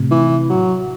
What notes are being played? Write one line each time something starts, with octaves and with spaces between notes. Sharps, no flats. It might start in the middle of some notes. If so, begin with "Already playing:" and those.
Already playing: A2 C3
E3
F#3